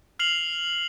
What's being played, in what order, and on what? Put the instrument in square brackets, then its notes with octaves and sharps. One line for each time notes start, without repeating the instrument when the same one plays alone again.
[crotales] F6 C7 F7 F#7